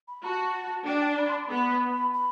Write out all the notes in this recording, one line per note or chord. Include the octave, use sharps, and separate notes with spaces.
B5
F#4 A5
D4 G5
A5
B5
C6
B5
B3 B5
B5